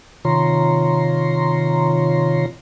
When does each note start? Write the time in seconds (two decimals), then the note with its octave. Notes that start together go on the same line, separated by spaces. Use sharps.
0.25 C3 D#3 F4 C#5 A#5 C6